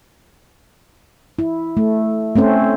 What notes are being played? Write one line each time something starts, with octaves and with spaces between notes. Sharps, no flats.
E4
A3
A3 C4 C#4 C5